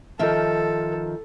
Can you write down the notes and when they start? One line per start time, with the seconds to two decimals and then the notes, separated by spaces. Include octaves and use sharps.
0.19 D#3 F3 A4 E5